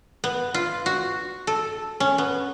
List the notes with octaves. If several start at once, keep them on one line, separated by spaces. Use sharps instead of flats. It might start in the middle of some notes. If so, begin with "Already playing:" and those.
B3
F4
F#4
A4
C#4
B3